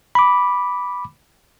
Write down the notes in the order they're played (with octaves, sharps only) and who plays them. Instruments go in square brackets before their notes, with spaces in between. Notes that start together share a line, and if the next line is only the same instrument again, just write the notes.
[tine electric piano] B5 D6